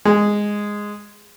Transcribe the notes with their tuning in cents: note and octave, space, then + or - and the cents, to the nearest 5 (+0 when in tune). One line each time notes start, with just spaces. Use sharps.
G#3 -5